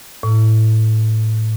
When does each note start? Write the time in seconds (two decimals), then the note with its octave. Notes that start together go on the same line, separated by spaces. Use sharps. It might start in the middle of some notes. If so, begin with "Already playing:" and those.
0.23 A2